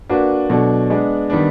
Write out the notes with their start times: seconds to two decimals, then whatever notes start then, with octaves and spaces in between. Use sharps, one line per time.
0.09 A#3 D4 F#4 B4
0.49 B2 F#3 A3 D4
0.90 G#3 B3 D4
1.30 D#3 G3 B3 D4